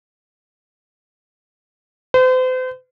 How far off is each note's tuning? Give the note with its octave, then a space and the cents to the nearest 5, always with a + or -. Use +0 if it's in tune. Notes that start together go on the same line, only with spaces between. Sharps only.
C5 -40